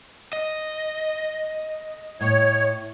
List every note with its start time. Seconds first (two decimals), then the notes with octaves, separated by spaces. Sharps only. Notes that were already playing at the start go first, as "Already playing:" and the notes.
0.33 D#5
2.21 A2 C#5